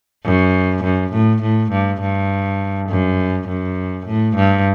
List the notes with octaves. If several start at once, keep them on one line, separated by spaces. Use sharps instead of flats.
F#2
F#2
A2
A2
G2
G2
F#2
F#2
A2
G2